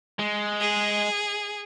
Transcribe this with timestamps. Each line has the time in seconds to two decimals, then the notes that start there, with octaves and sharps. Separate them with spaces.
0.19 G#3
0.61 G#4